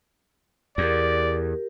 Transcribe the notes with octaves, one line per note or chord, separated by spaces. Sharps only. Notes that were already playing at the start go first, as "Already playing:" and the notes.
E2 G4 A#4 D5